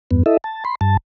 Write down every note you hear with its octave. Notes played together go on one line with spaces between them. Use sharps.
E2 G2 B3
E4 A4 D#5 E5
A5
B5 C6
G2 A5